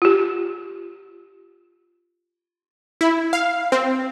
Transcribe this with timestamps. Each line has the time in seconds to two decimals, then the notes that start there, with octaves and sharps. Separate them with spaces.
0.02 F4 G4
3.01 E4
3.33 F5
3.72 C4